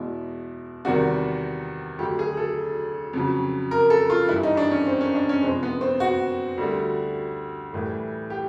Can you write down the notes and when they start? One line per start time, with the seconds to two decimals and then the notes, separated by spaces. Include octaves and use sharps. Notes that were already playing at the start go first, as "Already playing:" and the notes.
Already playing: E2 B2 G#3 E4
0.85 E2 C3 D#3 G3 F#4
1.99 D2 D3 F#3 G4
2.19 G#4
2.37 A4
3.13 F2 C#3 F#3
3.71 A#4
3.90 A4
4.10 F4
4.28 G2 E3 G3 E4
4.43 D#4
4.57 D4
4.71 C#4
4.87 C4
5.01 C#4
5.15 D4
5.29 C#4
5.43 F2 C3 F3 G#3 C4
5.63 B3
5.81 C4
6.00 F#4
6.58 D2 D3 G3
7.73 A2 E3 G3
8.30 G4